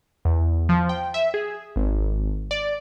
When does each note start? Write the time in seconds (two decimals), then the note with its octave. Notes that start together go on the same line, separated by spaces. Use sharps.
0.25 E2
0.69 F3
0.89 G5
1.14 E5
1.34 G#4
1.76 G#1
2.51 D5